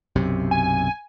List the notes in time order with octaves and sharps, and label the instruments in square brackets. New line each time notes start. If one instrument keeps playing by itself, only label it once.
[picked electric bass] B1 F#2 C3
[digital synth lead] G#5